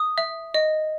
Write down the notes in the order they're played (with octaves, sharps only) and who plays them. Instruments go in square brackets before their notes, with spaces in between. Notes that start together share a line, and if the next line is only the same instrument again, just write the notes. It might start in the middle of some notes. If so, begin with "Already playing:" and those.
Already playing: [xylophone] D#6
E5
D#5